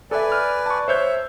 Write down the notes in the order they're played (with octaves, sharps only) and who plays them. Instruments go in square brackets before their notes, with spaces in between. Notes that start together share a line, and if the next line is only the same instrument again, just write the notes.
[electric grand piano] A4 E5 [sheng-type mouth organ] B4 D5 G#5
[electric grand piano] F6
A5 C#6
[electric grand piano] C5 C#5 G6 [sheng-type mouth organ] E5